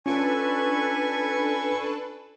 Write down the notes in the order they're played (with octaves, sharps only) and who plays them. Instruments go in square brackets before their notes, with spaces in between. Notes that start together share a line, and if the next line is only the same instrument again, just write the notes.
[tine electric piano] C#4 F4 [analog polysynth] D4 A4 B4 [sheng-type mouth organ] G#5 C#6